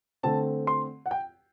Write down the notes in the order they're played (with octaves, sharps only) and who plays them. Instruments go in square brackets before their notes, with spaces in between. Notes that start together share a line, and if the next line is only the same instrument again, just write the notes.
[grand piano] D3 A3 C4 A5
C6
F#5
G5